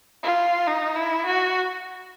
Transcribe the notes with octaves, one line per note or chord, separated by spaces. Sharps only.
F4
D#4
E4
F#4